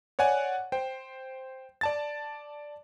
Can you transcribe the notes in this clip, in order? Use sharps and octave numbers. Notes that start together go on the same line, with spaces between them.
C#5 D5 F#5 G#5
C5 G5
D5 A5 A6